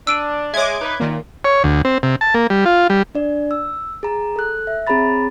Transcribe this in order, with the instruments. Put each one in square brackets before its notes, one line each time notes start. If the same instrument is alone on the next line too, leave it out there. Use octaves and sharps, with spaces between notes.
[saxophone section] D4 [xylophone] E6 D7 D#7
[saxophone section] G#3 [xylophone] C#5 E5 [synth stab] D6 G#6
[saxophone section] D#4 B4
[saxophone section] A#2 [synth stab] D#3 A#3
[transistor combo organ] C#5
D2
C4
C3
A5
A#3
G3
F4
G3
[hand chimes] D4 D5
E6
G#4 A#5
A4 F#6
E5
C4 G#4 C#5 A#5 B5 A6